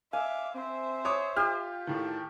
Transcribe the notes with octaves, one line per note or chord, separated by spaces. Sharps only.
E5 F5 G#5 D6
C4 C5 E5
C#5 D6 D#6
F4 G4 F6
A2 D#3 A5